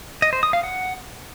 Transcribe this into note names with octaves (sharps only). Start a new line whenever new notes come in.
D#5
C5
D#6
F5
F#5